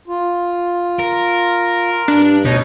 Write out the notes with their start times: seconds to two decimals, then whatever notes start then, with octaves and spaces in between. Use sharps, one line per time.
0.08 F4
0.99 A#4
2.08 G2 D4
2.45 D2 B2 D#4 C#5